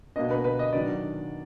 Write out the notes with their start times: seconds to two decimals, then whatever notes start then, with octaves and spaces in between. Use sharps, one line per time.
0.16 B2 A#3 D4 D#5
0.31 B4
0.44 B4
0.59 D#5
0.73 D#3 F#3 D4 D5